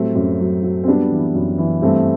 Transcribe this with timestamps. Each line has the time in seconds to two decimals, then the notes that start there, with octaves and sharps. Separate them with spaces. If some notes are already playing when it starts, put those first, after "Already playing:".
Already playing: A2 F#3 G3 A3 C4
0.16 F#2
0.40 F#3
0.63 F#3
0.84 C4
0.88 G3 B3 D4
1.12 E3
1.35 F#2
1.58 E3
1.82 G2 A3 C4